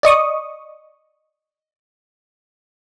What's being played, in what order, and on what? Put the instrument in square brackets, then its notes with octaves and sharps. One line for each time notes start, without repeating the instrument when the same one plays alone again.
[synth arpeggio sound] D5 D#5 C#6 D#6